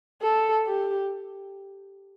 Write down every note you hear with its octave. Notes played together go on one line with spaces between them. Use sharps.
A4
G4